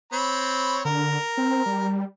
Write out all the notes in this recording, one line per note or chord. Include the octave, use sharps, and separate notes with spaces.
C4 C#5 B5
D3 A#4
C4
G3